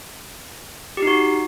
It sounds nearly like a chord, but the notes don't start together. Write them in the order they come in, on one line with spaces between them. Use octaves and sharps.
G4 D#4 F#4